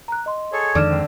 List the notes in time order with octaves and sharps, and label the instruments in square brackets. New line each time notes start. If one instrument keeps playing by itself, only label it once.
[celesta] A#5 F#6
D#5 C6
[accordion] G#4 A4 C#5
[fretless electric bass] F2 D#3 G#3 [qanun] D3 [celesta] D6 F6 E7
[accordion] G#2 C4